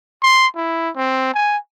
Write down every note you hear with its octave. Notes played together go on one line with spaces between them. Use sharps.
C6
E4
C4
G#5